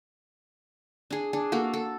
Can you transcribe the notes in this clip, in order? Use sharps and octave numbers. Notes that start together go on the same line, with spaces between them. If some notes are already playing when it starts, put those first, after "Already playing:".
D4 G#4
D4 G#4
A#3 F#4 A4
A4